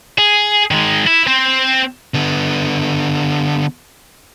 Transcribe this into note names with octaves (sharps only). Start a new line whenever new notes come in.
G#4
D#3 G#3
E4
C4 C5
D3 B3